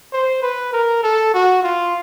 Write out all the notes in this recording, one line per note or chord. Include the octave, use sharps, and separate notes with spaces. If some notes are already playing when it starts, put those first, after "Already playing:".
C5
B4
A#4
A4
F#4
F4